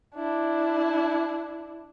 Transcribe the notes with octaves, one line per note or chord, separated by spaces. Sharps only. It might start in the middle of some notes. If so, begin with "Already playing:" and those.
D4 E4